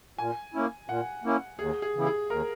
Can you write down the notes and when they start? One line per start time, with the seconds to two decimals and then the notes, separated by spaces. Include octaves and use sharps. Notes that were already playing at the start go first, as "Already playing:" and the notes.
0.18 A#2 G#5
0.54 A#3 C#4 E4
0.88 A#2 F#5
1.24 A#3 C#4 E4
1.59 D#2 G#4
1.82 G#4
1.95 C#3 E3 B3 E4
2.07 G#4
2.29 D#2 A#4